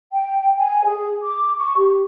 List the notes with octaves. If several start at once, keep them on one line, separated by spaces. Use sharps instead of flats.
G5
G#5
G#4
D6
C#6
G4